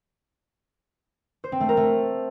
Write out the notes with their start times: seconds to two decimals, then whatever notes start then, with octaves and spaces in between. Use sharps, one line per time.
1.44 C5
1.52 C4
1.60 A3
1.69 A#4
1.77 A3